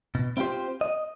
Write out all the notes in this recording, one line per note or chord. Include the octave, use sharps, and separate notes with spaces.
B2
C4 E4 F4 G4 C5
D#5